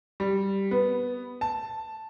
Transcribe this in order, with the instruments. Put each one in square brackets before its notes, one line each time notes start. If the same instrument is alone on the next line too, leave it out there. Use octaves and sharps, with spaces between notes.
[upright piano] G3
B3
A5